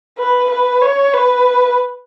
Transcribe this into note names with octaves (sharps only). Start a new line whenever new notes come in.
B4
B4
C#5
B4